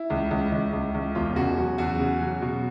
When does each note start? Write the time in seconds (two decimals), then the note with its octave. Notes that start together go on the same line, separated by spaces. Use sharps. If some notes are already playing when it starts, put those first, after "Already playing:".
Already playing: E4
0.10 C#2
0.31 C#2
0.52 C#2
0.73 C#2
0.94 C#2
1.15 E1 F4
1.36 C#3 F#4
1.57 F#3 F#4
1.78 E2 F#4
1.99 C#3
2.21 F#3
2.42 B2